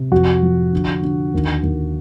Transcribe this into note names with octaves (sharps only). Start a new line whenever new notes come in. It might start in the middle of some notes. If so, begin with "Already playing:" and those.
Already playing: C3
F2 F#4
F3
D3
D3
D#2
D#2